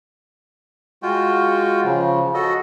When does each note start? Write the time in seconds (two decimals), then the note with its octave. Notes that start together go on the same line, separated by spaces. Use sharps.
1.03 G#3 F4 F#4 G5
1.85 C#3 F3
2.34 F#4 A4 D#5